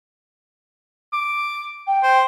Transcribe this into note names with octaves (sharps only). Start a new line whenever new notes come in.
D6
G5
C5